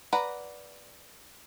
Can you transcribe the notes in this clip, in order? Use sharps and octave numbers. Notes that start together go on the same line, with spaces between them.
B4 D5 F#5 A#5